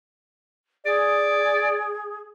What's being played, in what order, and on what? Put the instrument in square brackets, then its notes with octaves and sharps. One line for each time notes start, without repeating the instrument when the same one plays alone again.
[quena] G#4 [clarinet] D5